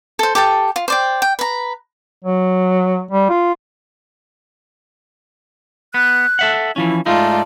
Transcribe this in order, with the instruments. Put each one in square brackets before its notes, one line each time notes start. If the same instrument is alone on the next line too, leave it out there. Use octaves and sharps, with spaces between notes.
[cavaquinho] A4 C5
G4 A4 G5 A5
F4
C5 D5 G5
G5
B4 A#5
[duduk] F#3
G3
F4
[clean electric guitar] B3 [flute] F#6
[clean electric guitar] A4 E5 F#5
[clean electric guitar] E3 F3 C#4 [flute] E4
[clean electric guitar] G#2 A3 D#4 [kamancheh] F4 D5 [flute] A5